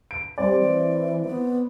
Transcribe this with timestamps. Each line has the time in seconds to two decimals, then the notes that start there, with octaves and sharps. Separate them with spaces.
0.11 D7
0.38 G3 C4 D5
0.60 E3
1.26 B3